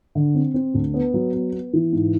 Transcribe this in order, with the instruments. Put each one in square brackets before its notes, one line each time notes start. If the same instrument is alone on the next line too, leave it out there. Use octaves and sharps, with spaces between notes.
[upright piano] D3
C4
C4
D2
B3
F#3
B3
B3
E3
G#2